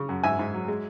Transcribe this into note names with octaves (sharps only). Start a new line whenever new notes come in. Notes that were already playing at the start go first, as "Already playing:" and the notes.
Already playing: C#3
F#2
G#2 E5 G#5
G#2
F#3
G#3